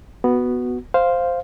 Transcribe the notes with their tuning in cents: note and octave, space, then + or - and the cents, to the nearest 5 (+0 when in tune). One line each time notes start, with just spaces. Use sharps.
B3 +0 F#4 +0
C5 +0 F5 +0